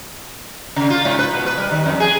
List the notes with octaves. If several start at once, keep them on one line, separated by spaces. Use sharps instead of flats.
C#3
F4
G#2
B4
B2
B4
G3
D#3
F2
G#4